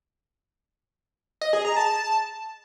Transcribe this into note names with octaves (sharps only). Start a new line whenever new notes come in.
D#5
G#4
A#5
A5